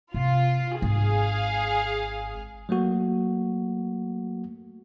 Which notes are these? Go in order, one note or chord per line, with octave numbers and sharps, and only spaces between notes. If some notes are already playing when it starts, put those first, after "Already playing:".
C3 F4
G#1 G#4 F5
F#3 A3 A#3 F#4